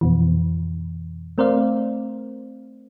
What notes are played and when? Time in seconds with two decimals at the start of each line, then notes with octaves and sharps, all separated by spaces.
0.01 F2 B2 E3
1.38 A3 C4 A#4 C5 D5 F5